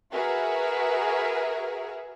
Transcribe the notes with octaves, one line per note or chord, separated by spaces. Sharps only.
F#4 G#4 A#4 B4 E5